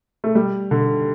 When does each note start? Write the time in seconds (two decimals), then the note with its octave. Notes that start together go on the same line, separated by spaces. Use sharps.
0.24 A3
0.35 G3
0.71 D3